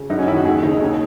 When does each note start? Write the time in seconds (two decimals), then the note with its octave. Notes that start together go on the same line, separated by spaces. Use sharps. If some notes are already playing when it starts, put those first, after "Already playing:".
Already playing: C#3
0.10 F#2 D#4
0.19 C#4
0.27 D#3 E4
0.36 F#4
0.45 D#2 G#4
0.63 C#3 D#4
0.80 D#2 C#4